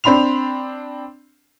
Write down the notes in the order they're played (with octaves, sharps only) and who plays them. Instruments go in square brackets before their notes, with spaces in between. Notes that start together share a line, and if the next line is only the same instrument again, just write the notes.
[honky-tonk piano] C4 D4 B5 C6 F7